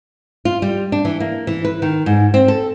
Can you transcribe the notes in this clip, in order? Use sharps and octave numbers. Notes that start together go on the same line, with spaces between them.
F4
G3
D4
E3
A#3
E3
B4
D#3
G#2
C4
A4